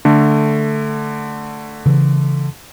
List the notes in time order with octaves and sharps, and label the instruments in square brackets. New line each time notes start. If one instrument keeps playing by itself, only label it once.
[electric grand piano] D3 A3
[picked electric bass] C#3 E3